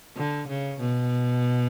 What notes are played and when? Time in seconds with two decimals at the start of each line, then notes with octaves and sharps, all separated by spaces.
0.17 D3
0.48 C#3
0.80 B2